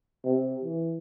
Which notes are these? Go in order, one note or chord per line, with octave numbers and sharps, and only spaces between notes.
C3
E3